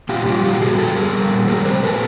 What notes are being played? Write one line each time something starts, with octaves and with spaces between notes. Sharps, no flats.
A#2 F4 G4
G3 F4 G4
A#2 F4 G4
G3 F#4 G#4
A#2 G4 A4
G3 G#4 A#4
G3
A#2
G3 G#4 A#4
G3 A#4 C5
A#2 A4 B4